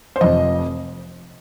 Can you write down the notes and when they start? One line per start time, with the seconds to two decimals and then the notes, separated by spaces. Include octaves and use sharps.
0.16 C5
0.21 F1 F2 F3 D#5